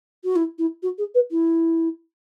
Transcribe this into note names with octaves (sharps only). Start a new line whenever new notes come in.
F#4
E4
E4
F#4
G#4
B4
E4